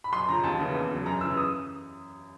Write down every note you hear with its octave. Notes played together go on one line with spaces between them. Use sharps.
B5
F#2 C6
C#3 F3 A#5
D#2 A5
C#3 E3
E2
C#3 F#3
F#2 A#5
C#3 E3 E6
D#6